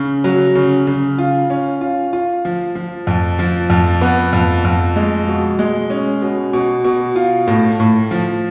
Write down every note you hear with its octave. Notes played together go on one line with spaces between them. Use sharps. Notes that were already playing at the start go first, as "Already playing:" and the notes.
Already playing: C#3
F#3
C#3
C#3
F4
C#4
F4
F4
F3
F3
F2
F3
F2
B3
F2
F2
G#3
B2
G#3
C#4
B2
B2
B2
F4
A2
A2
F3